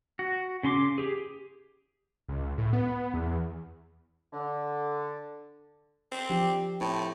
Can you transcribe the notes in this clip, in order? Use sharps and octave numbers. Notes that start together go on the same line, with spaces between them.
F#4
C#3 C#4 C6 D6
G4 G#4
C#2
A2
B3
E2
D3
C4
F3 D4 G4
A2 C4 E4 C5